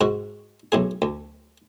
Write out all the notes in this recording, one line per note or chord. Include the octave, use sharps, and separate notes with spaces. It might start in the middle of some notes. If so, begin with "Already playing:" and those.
G#2 F#4
B1 A2 G#4
D2